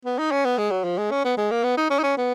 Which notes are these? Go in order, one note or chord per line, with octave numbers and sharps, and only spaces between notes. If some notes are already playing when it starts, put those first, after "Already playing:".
B3
D#4
C#4
B3
G#3
F#3
F3
G#3
C#4
B3
G#3
A#3
B3
D#4
C#4
D#4
C#4
B3